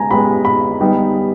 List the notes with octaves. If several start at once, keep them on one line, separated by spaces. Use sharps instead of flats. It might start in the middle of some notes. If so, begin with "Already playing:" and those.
Already playing: G#3 B3 G4 G#5 A#5
G#3 B3 G4 B5
B5
G3 B3 D#4 G4